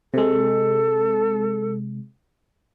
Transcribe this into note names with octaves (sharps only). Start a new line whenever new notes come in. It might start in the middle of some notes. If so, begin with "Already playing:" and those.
C3 G#3 A4